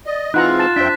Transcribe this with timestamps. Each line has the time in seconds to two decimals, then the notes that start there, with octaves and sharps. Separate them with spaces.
0.06 D5 D#5
0.34 E3 G#3 C4 D#4 F4 F#5 A#5 F#6
0.59 A5 A6 E7
0.76 F2 D4 C5 E5 G5 B6